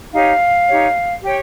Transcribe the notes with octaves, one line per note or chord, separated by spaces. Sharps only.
D#4 G4 C#5 F5
D#4 G4 C#5
G4 C#5 G5